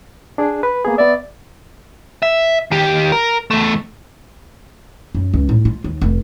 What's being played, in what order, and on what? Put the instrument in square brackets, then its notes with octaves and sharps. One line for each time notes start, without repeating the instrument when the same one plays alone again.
[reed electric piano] D4 G#4
B4
A#3 B3 G#4
[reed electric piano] B3 E5 [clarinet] D5
[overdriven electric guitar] E5
D#3 G4
A#4
E2 A3
[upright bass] F#2
C#2
A2
F4
D#2
F1